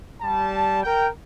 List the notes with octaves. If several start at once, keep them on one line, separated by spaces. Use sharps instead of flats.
G3 A5
A#4 G5